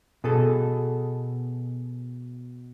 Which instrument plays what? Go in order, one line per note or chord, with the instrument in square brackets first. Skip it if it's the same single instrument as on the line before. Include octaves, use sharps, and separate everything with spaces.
[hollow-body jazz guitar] B2 G#4 A4